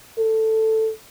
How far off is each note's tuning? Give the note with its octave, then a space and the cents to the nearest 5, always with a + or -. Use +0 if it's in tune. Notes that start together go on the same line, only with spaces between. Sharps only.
A4 +5